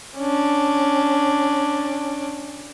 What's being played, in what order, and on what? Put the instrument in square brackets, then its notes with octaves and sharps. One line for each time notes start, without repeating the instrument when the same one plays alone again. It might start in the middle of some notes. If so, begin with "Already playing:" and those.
[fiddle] C#4 D4